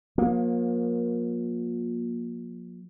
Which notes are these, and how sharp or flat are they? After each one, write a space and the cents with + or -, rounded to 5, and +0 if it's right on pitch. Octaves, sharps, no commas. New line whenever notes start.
F3 +40 A#3 +20